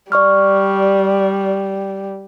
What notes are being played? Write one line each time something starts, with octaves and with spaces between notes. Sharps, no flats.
G3 D5 C#6 F6